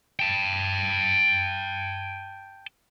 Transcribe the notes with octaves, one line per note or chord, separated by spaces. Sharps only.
G5 A5